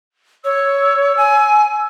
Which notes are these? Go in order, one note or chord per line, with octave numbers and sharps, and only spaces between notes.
C#5 E6
G#5